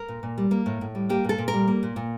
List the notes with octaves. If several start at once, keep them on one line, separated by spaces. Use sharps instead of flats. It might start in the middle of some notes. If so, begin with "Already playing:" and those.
Already playing: A#4
A#2
A#2
G3
A#3
A2
A2
G3
A#3 G4
A#2 A4
A#2
A#4
G3
A#3
A#2
A#2